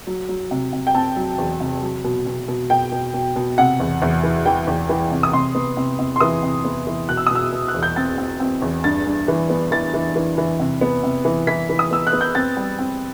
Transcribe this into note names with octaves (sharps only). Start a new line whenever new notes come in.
F#3
F#3
C3
C3
G5
C4 A5
F#3
E2
C3
F#3
B2
B2
B2
B2 G5
B2
B2
B2
C3 F#5
E2
E2
E3
E3 G5
E2
E3
C3
D#6
C3 C6
B3
C3
C3
C6
E3 D#6
C3
B3
E3
B2 F#6
E6
D#6
B2 E6
B2
F#6
E2
G6
C4 A6
C4
C4
E2
G2 A6
G2
E3
B3
E3 A6
E3
E3
E3
C3
B3
C3
E3
E3 B6
E3
D#6
B3 E6
F#6
B3
G6
C4 A6
G3
C4